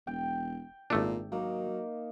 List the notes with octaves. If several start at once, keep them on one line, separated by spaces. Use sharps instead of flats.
E1 G5
G#1 A#2 A3 D4
F#3 A#3 D#4